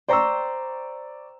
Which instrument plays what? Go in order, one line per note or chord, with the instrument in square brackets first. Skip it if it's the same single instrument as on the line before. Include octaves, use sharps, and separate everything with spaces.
[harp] C5 G5 A#5 [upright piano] D5 C#6 E6